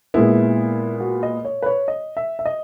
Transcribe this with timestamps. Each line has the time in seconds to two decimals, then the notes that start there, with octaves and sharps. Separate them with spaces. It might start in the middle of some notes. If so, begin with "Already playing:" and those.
0.14 A#2 G#3 B3 E4
1.00 F#4
1.23 D#5
1.45 C#5
1.62 B4
1.66 C#5
1.88 D#5
2.17 E5
2.39 E5
2.46 D#5